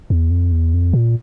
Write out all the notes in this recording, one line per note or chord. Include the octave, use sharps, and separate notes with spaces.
E2
F2
E2
F2
A#2